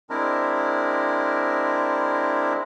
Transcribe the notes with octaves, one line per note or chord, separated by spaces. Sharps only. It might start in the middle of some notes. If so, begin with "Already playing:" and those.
G#3 C4 D4 E4 A#4